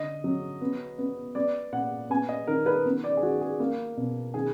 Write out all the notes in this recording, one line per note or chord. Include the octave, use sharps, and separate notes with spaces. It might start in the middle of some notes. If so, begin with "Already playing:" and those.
Already playing: D3 D#5
F#3
B3
B3
B3 D5
A#2 F#5
B3 G#5
D#5
D#3 A#4
B4
B3
D5
G#4
D#3 F#4
G#4
A#3
B2
D#3 G#4